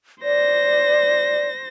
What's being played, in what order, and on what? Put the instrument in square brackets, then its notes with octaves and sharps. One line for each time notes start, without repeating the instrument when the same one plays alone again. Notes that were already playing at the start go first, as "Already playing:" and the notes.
[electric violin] C5 A#6 [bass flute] D5